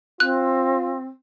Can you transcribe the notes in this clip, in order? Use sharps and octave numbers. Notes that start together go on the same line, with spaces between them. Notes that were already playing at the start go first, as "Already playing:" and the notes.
C4 F4 F#6